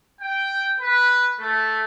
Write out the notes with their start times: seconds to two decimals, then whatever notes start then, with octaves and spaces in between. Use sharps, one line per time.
0.21 G5
0.79 B4
1.39 A3